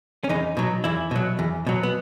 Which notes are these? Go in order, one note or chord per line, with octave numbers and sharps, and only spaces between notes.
C#4
E2 D#4
B2 F#3
E2 E4
B2 F#3
E2
B2 F#3
B3